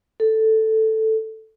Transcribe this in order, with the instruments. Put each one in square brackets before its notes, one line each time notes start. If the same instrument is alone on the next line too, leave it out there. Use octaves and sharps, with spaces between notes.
[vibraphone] A4